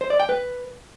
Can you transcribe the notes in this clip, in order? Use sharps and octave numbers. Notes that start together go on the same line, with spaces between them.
C5
D5
G5
B4